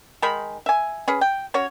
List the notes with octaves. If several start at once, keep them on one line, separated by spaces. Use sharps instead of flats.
D#3 G#3 D#4 B5
E5 G#5
C#4 G#4 B4
G5
C#4 F#4 C#5